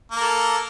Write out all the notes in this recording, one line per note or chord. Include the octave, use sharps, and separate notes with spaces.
A#3 A4 A#4